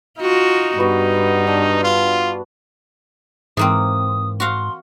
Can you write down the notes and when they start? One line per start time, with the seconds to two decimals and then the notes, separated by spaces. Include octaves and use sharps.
0.19 D#4 F4 F#4
0.78 G2 B3 F#4
1.47 D4
1.84 F4
3.57 G#2 E3 A#3 C4 D#6
4.40 F#4 F5 C6